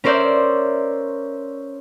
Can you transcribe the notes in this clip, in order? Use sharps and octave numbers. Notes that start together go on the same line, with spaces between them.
C#4 A#4 C5 D5 E5 G6